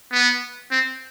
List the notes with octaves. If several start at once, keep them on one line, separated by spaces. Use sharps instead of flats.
B3
C4